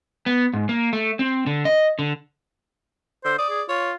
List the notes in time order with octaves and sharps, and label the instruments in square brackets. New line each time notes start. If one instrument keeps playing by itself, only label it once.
[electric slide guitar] B3
G#2
A#3
A3
C4
D3
D#5
D3
[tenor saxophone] D3 [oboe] C5
[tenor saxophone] D5 [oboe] D#6
[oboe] G#4
[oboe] F4 [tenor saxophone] C#5